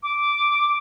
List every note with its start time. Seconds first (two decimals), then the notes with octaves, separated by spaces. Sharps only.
0.03 D6